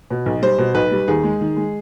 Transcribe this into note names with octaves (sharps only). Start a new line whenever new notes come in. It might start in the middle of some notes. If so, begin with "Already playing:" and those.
B2
B1
G3 C5
B2
B1 B4
G3
D#2 G#4
G#3
D#3
G#3